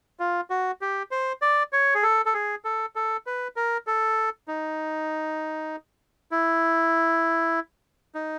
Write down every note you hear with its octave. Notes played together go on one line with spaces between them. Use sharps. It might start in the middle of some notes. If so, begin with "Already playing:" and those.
F4
F#4
G4
C5
D5
C#5
G#4
A4
A4
G#4
A4
A4
B4
A#4
A4
D#4
E4
D#4